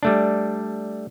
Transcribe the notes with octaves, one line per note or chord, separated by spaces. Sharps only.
G3 A3 D4